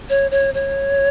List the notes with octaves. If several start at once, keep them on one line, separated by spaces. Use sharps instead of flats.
C#5
C#5
C#5